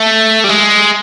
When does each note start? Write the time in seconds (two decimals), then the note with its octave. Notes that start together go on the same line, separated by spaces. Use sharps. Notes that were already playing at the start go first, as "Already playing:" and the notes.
Already playing: A3
0.44 G3
0.49 G#3